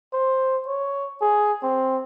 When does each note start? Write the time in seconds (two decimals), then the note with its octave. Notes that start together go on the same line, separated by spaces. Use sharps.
0.13 C5
0.67 C#5
1.22 G#4
1.63 C4